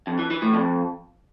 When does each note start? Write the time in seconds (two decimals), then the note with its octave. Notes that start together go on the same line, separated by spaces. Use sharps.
0.07 F2
0.19 E3
0.30 E3
0.42 A2
0.54 F2